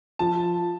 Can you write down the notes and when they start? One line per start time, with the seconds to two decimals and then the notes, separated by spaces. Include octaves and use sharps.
0.19 F3 A5